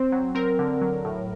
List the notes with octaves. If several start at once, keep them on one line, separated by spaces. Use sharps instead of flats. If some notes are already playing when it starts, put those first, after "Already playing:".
Already playing: C4 C5
F#3
C4 A#4
D3
F#3
A2